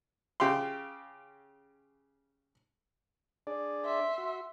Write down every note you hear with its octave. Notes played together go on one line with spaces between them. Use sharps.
C#3 G4 F5 C6
D4 G#4 D5
E5 C6
F#4